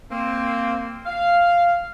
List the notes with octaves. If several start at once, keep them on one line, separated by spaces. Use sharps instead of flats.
A#3 C4
F5